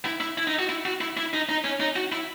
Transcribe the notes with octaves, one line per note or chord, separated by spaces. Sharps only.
E4
E4
E4
D#4
F#4
E4
F#4
E4
E4
D#4
D#4
C#4
D#4
F#4
E4